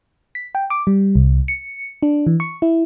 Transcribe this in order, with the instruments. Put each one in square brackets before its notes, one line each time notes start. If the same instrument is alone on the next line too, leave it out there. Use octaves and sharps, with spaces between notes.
[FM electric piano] B6
G5
D6
G3
C2
C#7
D4
E3
C#6
E4